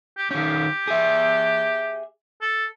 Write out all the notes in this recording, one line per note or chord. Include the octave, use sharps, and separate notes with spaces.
G4
D#3 C#4 G4
G#4 E5
A4